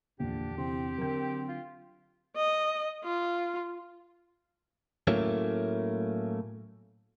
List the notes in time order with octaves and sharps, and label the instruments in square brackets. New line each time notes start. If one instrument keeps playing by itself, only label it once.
[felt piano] A#1 [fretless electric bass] E2 D3 [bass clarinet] D4 [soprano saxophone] G4
[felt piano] C3 E3 [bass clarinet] C4
[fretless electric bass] D3 F#3 [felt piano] A#4 G6
[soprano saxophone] F4
[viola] D#5
F4
[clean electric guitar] A2 F#3 A3 A#3 C#4